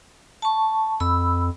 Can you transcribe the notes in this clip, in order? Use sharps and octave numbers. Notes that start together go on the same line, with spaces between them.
A5 C#6
F2 B5 E6